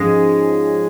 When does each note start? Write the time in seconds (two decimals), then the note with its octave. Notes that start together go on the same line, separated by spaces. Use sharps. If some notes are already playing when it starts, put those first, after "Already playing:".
Already playing: G#2 F3 G#3 C#4